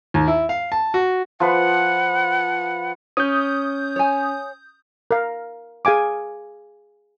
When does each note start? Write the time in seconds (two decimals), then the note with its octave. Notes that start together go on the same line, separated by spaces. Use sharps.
0.14 D#2
0.28 E4
0.49 F5
0.72 A5
0.94 F#4
1.40 F3 B4 F#5
3.17 C#4 D#6 G6
3.96 C#5 G#5
5.11 A#4 F5
5.85 G#4 F5 G#5 D6